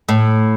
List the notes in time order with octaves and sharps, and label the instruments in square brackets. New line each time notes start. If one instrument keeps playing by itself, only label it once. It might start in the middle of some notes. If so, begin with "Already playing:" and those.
[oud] A2